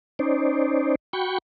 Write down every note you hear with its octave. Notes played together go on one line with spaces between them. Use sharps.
C#4 D#4 C5 D5
F#4 G5 B5 C#6